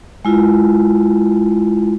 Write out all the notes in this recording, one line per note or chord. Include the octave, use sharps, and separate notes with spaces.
G#3 E4 F4